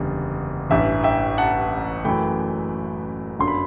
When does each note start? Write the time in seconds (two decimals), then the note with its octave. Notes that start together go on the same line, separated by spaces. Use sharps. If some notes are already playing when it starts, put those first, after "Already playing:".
Already playing: F#1 E2 D3 G3
0.70 A1 G2 E3 E5
1.03 E5 G5
1.38 F#5 A5
2.04 F#2 E3 A3 G5 B5
3.39 G1 F#2 D3 C6
3.48 B5